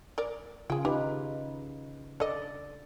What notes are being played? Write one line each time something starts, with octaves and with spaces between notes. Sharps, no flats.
A#4 D5
C#3 F4 G#4 G5
D#4 G4 B4
A4 D5 D#5